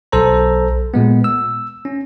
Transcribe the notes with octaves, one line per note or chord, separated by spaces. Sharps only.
B1 A4 C5 A#5
A#2 G#3 B3
E6
C#4